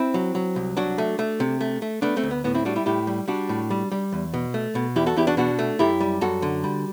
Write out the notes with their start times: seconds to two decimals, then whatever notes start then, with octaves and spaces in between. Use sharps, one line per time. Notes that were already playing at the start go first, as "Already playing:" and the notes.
Already playing: C4 E4
0.14 F#3
0.35 F#3
0.56 C2
0.77 F#3 D4 F#4
0.98 A3
1.19 A3
1.40 C3
1.61 A3
1.82 A3
2.02 A3 B3 D4
2.17 A3 C4
2.23 D2
2.31 B3
2.44 A2 B3
2.55 C4 E4
2.65 G3 D4 F#4
2.76 E4 G4
2.86 A2 E4 G4
3.07 G3
3.28 G3 D4 F#4
3.49 A2
3.70 G3
3.92 G3
4.12 E2
4.34 B2
4.54 A3
4.75 B2
4.96 E2 E4 G4
5.06 F#4 A4
5.16 E2 E4 G4
5.27 D4 F#4
5.37 B2 D4 F#4
5.59 A3
5.79 F#2 E4 G4
6.00 G3
6.21 F#2 F#4 A4
6.42 D3
6.64 G3